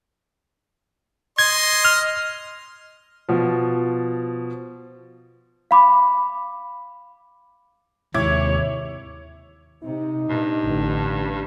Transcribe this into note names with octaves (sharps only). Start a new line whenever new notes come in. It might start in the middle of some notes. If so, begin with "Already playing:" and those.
D#5 C6 G#6
F6
B2 F3
F5 B5 D6
D#2 G#2 C3 E4 C#5 D6 G#6
C3 D#4
G2 A#2
A1 D3